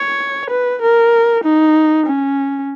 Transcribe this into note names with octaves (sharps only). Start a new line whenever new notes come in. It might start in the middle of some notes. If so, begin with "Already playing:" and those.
Already playing: C#5
B4
A#4
D#4
C#4